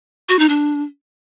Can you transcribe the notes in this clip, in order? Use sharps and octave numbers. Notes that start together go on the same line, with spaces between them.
F#4
D#4
D4